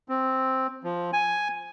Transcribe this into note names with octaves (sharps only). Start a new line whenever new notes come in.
C4
F3
G#5